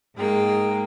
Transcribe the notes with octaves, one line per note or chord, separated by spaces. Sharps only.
G#2 G#3 A#3 G5